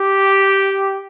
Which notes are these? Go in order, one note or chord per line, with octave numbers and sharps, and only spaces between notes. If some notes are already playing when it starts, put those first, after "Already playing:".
Already playing: G4